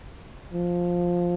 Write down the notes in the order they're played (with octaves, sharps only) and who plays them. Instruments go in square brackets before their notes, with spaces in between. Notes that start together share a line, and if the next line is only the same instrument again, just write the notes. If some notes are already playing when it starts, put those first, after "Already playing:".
[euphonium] F3